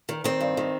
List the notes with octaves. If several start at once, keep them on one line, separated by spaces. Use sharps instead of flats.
D#3
D#3 C4
G2
D#3